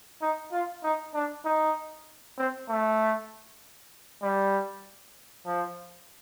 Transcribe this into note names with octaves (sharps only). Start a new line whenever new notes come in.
D#4
F4
D#4
D4
D#4
C4
A3
G3
F3